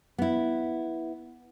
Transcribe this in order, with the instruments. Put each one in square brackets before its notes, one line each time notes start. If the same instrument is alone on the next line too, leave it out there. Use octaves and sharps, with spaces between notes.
[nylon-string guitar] B3 E4